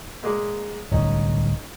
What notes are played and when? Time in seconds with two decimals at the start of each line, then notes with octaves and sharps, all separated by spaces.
0.23 A#2 G#3 D6
0.91 D1 C2 C#4 D#4